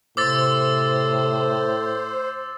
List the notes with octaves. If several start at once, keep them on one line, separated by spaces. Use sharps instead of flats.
A2 C3 C5 D6 E6 A6